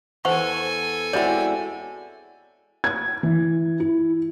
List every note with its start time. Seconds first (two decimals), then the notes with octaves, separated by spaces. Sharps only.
0.25 E2 A4 C5 F#5 G#5 C#6
1.13 G#3 C4 E4 F#4 C#5 D5
2.84 G#6
3.23 E3
3.80 E4